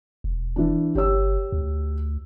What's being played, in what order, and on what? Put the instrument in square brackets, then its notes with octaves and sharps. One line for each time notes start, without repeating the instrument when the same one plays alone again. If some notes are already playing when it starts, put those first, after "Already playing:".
[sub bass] E1
[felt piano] E3 D4
[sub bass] G1 [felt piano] G4 C#5 E6
[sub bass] D2